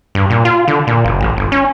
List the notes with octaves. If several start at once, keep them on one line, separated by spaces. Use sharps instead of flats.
G2
A#2
F4
D3
A#2
F#1
A1
G1
C#4